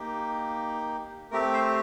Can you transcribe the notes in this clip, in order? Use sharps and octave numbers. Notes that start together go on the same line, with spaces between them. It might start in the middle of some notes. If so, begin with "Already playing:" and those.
Already playing: A#3 D#4 G4
A3 C4 G4 A#4
C5